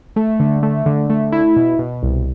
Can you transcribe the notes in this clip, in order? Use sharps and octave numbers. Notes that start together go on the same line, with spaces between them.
A3
D3
A3
D3
A3
E4
B2
B2
C2